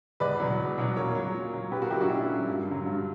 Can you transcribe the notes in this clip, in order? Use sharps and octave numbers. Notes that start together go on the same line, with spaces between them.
E2 B4 D5
B2 F#3
E2
B2 F#3
A#2 A#4 C#5
F#3
A#2
F#3
A#2 G4 B4
F#4 A#4
F#3 E4 G4
D4 F#4
A#2 C#4 E4
F#3
G2
D3 F#3
G2